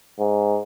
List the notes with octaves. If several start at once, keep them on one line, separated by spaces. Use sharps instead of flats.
G#2